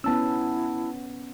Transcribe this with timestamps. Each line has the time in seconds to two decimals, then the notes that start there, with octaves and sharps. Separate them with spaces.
0.04 B3 C#4 E4 A5 E6